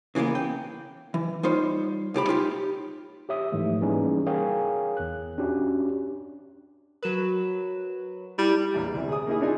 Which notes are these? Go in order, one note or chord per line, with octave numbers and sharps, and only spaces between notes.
C#3 E3 G#3 A#3 B3
G5
E3
G3 D#4 F4 C5 C#5
C2 A2 G4 B5
D#4 F4 G4
G4 C#5 E5 D#6
G#2 E3 F3 A3
E3 G3 A#3 C#4 D#4 G#4
G#4 A#4 C#5 F5 G5 G#5
E2 F#6
C#4 D4 F#4 G4
F#3 A#4 B4 E7
G3 E4
A#1 E2
D2 C3
G#4 D#6
A#3 D#4 E4 G#4
D4 D#4 F4 G#5